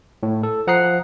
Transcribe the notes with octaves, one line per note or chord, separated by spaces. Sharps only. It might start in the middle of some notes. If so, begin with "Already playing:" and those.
A2
A4
F3 F#5 A#5 D#6 F#6 C7